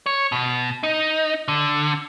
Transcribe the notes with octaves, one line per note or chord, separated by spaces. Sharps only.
C#5
B2
D#4
D3